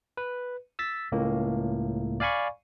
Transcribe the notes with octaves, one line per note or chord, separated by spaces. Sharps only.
B4
E6 A6 B6
C#2 A2 A#3
D5 F5 G#5 B5 C#6